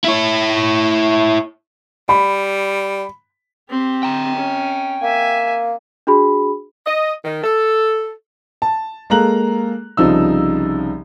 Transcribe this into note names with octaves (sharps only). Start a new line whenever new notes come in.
E4 C#5
G3 B5
C4 G4
G5 A#5
C#4
A#3 E5 G#5
D4 F#4 G#4 B5
D#5
D#3
A4
A5
G#3 A#3 A4 A#5 F#6 F#7
C2 C#3 F3 D#4 E6